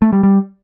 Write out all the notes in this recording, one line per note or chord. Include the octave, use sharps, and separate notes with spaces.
A3
G3
G3